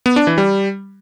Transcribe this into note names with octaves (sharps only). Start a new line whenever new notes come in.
B3
D4
E3
G3